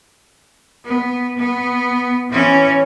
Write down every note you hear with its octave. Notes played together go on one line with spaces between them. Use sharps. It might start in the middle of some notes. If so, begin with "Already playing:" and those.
B3
B3
E3 C#4